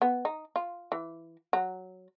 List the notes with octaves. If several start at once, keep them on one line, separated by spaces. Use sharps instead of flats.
B3
D#4
F4
E3
F#3